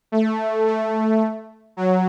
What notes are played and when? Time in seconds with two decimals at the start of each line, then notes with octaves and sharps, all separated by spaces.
0.12 A3
0.67 A3
1.77 F#3